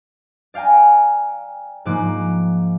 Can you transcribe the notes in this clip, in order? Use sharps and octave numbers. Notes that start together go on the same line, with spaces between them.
D5 F5 G5 G#5 A#5
G#2 F3 A#3 D6 F#6